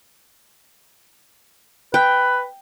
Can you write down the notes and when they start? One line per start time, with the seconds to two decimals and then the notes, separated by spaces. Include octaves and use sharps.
1.94 B4 G5